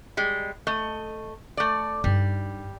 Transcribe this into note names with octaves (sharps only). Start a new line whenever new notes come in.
G3 G#3
A3 D#5
A3 D5
G2 G3 D#4